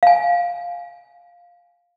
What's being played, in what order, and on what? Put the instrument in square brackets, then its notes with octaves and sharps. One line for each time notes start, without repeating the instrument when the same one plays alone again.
[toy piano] F5 G#5